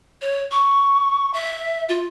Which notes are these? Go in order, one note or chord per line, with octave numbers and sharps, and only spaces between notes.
C#5
C#6
E5
F4